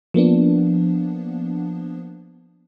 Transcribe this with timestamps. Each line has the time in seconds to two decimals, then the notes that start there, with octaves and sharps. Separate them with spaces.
0.14 F3 A#3 B3 D4